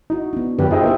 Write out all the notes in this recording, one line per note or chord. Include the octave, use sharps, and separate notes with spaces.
D#4 E4 F#4
B3 D4
F#2 D3 F4 G4 B4 G5
D#4 F4 G#4 C5 D#5 E5 G5
A#3 E4 G4 B4 E5